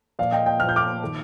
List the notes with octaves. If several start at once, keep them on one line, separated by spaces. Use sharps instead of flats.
A#2 F3 D5 F5
D#5 G5
D#5 G5
A#2 F3 F6
G6
D6 F6
D#3